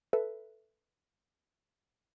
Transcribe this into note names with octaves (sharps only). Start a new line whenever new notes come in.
A4 B4 E5